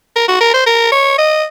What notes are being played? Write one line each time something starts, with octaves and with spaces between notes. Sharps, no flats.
A#4
F#4
A#4
C5
A#4
C#5
D#5